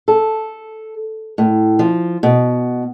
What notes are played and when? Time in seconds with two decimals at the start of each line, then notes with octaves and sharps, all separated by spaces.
0.08 A4
1.38 A2
1.79 F3
2.23 B2